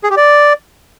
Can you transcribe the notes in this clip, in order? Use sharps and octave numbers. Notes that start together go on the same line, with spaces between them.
G#4
G4
D5